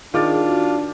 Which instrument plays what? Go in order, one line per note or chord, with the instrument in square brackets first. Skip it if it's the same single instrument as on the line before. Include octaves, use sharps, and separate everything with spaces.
[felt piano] D#3 D6 A6 [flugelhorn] D4 [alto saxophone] F4 [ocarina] G#4
[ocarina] F#4